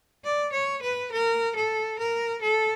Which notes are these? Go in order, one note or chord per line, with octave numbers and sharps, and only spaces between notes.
D5
C#5
B4
A#4
A4
A#4
A4